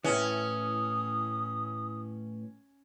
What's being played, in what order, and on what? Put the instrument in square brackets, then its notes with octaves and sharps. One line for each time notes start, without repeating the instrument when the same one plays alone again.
[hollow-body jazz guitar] A2 E3 [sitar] C#4 [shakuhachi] D#6